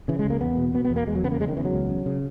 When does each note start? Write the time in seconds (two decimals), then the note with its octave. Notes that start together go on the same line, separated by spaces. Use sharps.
0.08 C#3 E3
0.19 G#3
0.25 C#2 A#3
0.41 E2 B3
0.57 B2
0.74 B2 B3
0.85 B3
0.90 E2
0.96 A#3
1.07 E2 G#3
1.15 F#3
1.24 C#3 B3
1.31 A#3
1.40 C#3 G#3
1.48 D#3
1.56 E2 E3
1.65 F#3
1.73 C#2
1.89 C#3
2.06 C#3